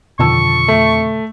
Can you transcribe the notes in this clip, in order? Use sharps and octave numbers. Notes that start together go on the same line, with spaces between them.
F2 B2 D3 D#3 A5 C#6 E6
A3